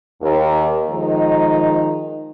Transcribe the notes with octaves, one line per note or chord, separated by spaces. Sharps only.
D#2
D#3 F3 G#3 D#4